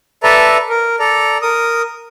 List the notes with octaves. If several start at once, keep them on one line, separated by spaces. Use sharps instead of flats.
A4 B4 D5 E5 A5 A#5
A#4
A4 D5 A#5
A#4 D#6